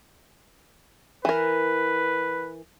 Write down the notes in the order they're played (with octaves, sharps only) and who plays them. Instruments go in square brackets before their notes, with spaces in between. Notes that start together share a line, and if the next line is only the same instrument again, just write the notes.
[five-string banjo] E3 A#4 [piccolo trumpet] B4